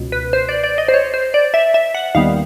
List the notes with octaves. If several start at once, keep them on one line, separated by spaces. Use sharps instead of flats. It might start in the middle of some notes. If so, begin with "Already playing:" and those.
Already playing: C#2 B2 B3
B4
C5
D5
D5
D#5
C5
C#5
C5
D5
E5
E5
F#5
D#2 D#3 G3 B3 F5